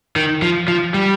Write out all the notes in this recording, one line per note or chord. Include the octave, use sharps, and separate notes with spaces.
D#3
F3
F3
G3